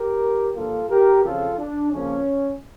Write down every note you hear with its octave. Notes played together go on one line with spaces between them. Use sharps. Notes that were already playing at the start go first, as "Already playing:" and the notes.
Already playing: G4 A#4
G2 D3 F3 A#3 F4 A4
G4 A#4
F2 C#3 F3 F4 A4
D4
F2 C#3 F3 A#3 C#4